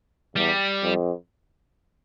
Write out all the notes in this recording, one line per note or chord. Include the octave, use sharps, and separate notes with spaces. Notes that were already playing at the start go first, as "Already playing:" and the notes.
E2 G3
F2